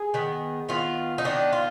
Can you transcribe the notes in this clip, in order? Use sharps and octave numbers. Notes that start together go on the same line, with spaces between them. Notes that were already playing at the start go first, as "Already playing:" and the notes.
Already playing: G#4
D#3 B3
D#3 B3 F4
D#4
D#3 B3 D4
F4